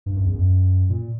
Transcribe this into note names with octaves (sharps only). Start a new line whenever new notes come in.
G2
F#2
E2
F#2
A#2